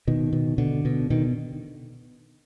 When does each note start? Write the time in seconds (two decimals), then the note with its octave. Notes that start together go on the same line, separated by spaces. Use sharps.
0.07 B2 D#3
0.33 B2
0.58 B2 D3
0.85 B2
1.10 B2 D#3